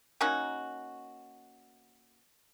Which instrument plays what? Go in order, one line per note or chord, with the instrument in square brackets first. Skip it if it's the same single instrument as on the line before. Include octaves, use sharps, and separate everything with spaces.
[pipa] A#3 C#4 D#4 F#4